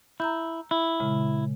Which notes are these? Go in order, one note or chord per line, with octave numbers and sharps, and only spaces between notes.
E4 A#5 E6 G6
E4
A#2 C#3 G#3